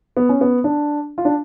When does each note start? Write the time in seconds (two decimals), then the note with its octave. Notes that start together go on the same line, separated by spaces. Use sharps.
0.17 B3
0.29 C#4
0.41 B3
0.64 D4
1.18 F4
1.25 D4